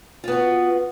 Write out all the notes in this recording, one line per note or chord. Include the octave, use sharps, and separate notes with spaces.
B3 F4 F#4